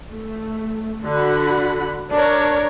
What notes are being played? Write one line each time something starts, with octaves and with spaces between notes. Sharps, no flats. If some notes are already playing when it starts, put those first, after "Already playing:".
A3
D3 F#4 F#5 B5
D4 A#4 C#5